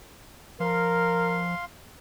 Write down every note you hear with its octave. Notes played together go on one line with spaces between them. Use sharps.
F3 A#4 F5 C6